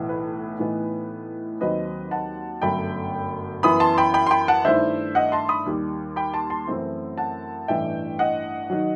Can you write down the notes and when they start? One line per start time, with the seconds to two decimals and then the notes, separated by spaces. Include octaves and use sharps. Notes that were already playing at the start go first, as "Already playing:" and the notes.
Already playing: B1 A2 E3
0.09 B4
0.59 A2 E3 B3 D#4
1.61 D#2 D#3 F#3 C4 D#4 B4 D#5
2.11 F#5 A5
2.62 G1 F#2 F#3 A3 G5 B5
3.63 F#2 E3 B3 E4 B5 D#6
3.80 A5 C6
3.98 G5 B5
4.14 G5 B5
4.27 C6
4.31 G5 B5
4.48 F#5 A5
4.65 G2 D#3 A3 E4 C5 E5
5.15 D#5 F#5
5.32 A5 C6
5.49 B5 D#6
5.66 D#2 D#3 G3
6.16 G5 B5
6.34 A5 C6
6.50 A5 C6
6.67 F#2 E3 A3 C4 E4
7.18 F#5 A5
7.68 A1 G2 E3 A3 E5 G5
8.19 D#5 F#5
8.70 D#3 F#3